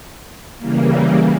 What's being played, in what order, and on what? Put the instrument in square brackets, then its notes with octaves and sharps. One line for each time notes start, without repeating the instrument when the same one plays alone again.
[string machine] C#3 E3 G3 A#3